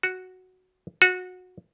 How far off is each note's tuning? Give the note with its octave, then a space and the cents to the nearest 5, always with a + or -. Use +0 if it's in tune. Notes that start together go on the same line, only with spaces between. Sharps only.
F#4 +0
F#4 -20